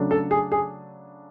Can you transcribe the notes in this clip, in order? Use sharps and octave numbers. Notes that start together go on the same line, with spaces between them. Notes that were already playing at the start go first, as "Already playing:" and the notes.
Already playing: C#3 F#3 A3 D4
A4
G#4
G#4